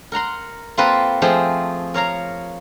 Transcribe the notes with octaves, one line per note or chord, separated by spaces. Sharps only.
A#4 F#5 A#5 C6
A#3 C4 F4 A4 B4
F3 A3 C4 G#4 G5
A#4 C#5 F5 A#5